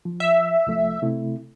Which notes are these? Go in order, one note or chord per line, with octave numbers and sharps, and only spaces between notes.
F3
E5
C2 F3 A3
C3 A3 E4